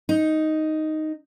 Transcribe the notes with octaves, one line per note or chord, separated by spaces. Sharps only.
D#4